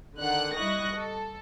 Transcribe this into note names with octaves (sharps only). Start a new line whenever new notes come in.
D3 D#3 D4 F#5 F#6
G3 E4 D#5 C#6 F#6 A#6
A4